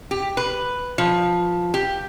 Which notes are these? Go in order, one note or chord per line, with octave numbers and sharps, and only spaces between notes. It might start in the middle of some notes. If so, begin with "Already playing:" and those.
G4
B4
F3
G4